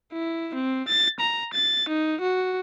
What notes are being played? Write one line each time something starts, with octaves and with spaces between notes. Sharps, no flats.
E4
C4
A6
A#5
A6
D#4
F#4